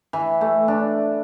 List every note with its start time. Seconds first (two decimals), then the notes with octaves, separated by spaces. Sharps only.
0.13 E3
0.41 A3
0.68 D4